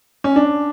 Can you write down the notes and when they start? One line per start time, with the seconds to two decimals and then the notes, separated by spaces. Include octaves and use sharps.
0.24 C#4
0.36 D4